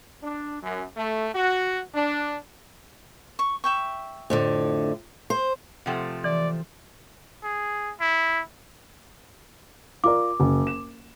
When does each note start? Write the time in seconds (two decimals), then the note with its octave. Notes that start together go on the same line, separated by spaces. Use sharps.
0.23 D4
0.62 F#2
0.97 A3
1.35 F#4
1.94 D4
3.39 C#6
3.64 E5 G5 C#6
4.30 F2 A2 D3
5.30 C5
5.86 C3 F3 A3 F#5 G5
6.24 E3 D5
7.44 G#4
8.00 E4
10.04 F4 A#4 D5 D6
10.40 F#1
10.67 E7